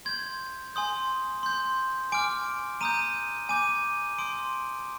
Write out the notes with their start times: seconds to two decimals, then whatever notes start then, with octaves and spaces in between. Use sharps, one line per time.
0.05 C6 G6 G#6
0.75 G#5 C6 D#6 G6
1.43 C6 G6
2.12 G#5 D6 F6 D7
2.81 A#5 D#6 G6 D#7
3.49 G#5 D6 G6 D#7
4.18 C6 D#6 G6 D7